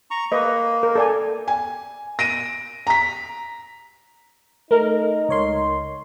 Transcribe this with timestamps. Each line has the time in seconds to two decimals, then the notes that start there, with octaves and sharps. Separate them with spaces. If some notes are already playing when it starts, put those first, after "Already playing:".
0.11 A#5 C#6
0.32 A#3 B4 D#5
0.83 A#4
0.95 A4 D5 G#5
1.48 G#5
2.19 A#6 D7 D#7
2.87 A#5 B6
4.71 A3 D#4 A#4
5.29 C#2 C#5 C6